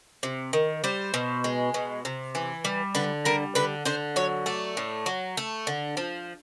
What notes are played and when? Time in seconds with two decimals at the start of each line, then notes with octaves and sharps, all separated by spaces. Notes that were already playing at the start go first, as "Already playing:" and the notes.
0.23 C3
0.53 D#3
0.84 G3 C5
1.14 B2
1.44 G#3
1.74 B2
2.05 C3
2.35 E3
2.65 G3
2.95 D3 B4
3.25 G3 A#4
3.55 D3 B4
3.85 D3 C5
4.16 F#3 C#5
4.46 A3 D5
4.77 A2
5.06 F#3
5.37 A3
5.67 D3
5.97 F3